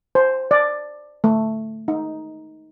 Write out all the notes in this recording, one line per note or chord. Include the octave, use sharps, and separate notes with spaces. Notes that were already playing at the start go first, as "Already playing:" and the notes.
C5
D5
A3
D#4